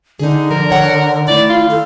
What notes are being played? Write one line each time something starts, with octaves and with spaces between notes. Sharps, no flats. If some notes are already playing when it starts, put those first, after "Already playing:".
D3 D#4 G#4
F3 A#4
C#5 F#5
D#3 A3 E4 D5
F4
A4